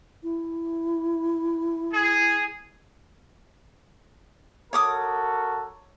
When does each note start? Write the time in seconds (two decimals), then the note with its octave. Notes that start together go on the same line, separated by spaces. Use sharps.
0.23 E4
1.92 G#4
4.73 F#4 A4 A#4 C#5 D6 D#6